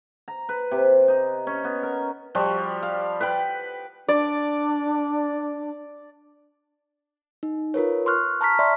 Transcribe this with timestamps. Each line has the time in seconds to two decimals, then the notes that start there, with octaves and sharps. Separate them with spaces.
0.28 A#5
0.49 B4
0.71 C3
1.08 D#4
1.47 C#4
1.64 B3
1.83 A#4
2.35 F3 G3 F#4
2.82 F5
3.20 B4 F#5 G5 B5
4.08 D4 D5
7.43 D#4
7.74 F4 A#4 B4 C#5
8.06 C6 C#6 F6 F#6
8.41 A5 A#5 C#6 F6 B6
8.59 D5 E5 C6 C#6